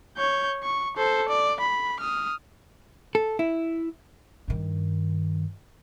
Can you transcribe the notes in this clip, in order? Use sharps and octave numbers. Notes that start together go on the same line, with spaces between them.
C#5 G6
C#6
A4 C5
D5
B5
D#6 F6
A4
E4
G2 D#3